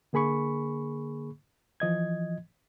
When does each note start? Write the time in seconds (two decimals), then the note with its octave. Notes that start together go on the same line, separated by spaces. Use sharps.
0.13 D3 A#3 G#4 B5 C#6
1.80 E3 F3 D#5 G#6